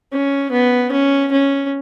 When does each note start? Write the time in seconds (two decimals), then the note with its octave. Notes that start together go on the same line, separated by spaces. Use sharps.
0.12 C#4
0.51 B3
0.92 C#4
1.32 C#4